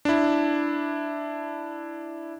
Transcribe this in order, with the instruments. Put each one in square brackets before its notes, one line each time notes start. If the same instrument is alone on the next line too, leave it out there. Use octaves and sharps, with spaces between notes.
[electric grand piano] D4 E4